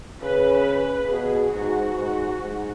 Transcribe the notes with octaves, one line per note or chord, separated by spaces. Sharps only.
C#3 B4
B2 G#4
G#2 F#4
G#2
G#2